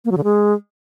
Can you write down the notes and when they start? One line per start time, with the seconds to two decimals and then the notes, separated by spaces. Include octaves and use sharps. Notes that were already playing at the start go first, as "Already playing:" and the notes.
0.05 A#3
0.11 F#3
0.18 D3
0.24 G#3